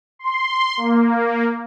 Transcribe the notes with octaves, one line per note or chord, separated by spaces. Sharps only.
C6
A#3